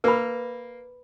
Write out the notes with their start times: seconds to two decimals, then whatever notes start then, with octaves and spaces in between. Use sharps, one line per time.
0.04 A#3 B4 B5